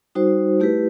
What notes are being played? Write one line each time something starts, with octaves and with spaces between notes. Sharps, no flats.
G3 D#4 F#4 C5
A3 E4 G4 B4